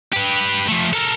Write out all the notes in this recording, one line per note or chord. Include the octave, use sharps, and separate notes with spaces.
G4 B4
F3 A3
A4 A#4